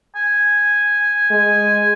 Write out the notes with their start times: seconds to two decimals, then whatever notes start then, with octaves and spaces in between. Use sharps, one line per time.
0.16 G#5
1.31 G#3